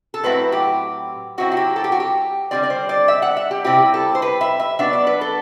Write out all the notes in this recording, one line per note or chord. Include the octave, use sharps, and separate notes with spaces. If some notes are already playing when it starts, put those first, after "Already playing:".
A4
A2 F#3 C4 E4 B4
G4
F#3 C4 E4 F#4
F#4
G4
A4
G4
F#4
G4
D3 G3 C4 D5
D5
C5
D5
E5
F#5
E5
G4
C3 G3 C4 E4 G4
A4
C5
B4
E5
E5
F#3 B3 D4 E5
D5
B4
A4